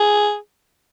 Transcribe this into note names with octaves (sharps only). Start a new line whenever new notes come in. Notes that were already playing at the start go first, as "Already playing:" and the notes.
Already playing: G#4